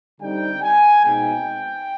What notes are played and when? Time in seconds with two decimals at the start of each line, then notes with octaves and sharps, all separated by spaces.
0.21 D3 G3 C4 D#4 G5
0.63 G#5
1.04 B2 G#3 C4 D#4 G5